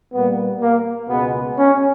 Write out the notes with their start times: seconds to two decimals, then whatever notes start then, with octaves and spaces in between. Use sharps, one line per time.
0.14 A#2 G3 A#3 B3
0.62 A#3
1.09 C#2 B2 G#3 B3
1.57 C#4